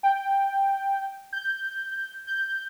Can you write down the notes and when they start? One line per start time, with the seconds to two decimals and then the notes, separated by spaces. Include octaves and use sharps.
0.03 G5
1.33 G6
2.27 G6